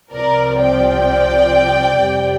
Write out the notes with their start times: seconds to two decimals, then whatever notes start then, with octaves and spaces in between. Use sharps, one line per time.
0.12 C2 C3 F3 C4 A#4 D5
0.59 D5 G5
1.96 F2 C3 G3